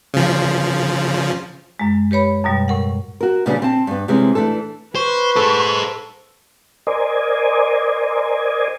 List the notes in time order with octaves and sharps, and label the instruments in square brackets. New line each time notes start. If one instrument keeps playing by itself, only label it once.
[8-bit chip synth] C#3 F3
[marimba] F#2 G#3
G4 B4 C#5 B5
F#2 B2 G3
A2 A#4 F#5
[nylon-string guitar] F#4 A#4
A#2 C#3 G3 B3 C#4 D4
C4 A5
G2 B3
C3 E3 G3 G#3 C4 C#4
E3 A3 D4 A4
[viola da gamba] B4 [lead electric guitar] C5 [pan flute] C#6
[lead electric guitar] G#4 C5 [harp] A4
[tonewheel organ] A#4 C5 D5 D#5 G#5